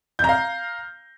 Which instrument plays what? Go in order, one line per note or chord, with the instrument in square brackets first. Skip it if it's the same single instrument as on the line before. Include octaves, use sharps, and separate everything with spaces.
[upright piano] G6
A#5
F5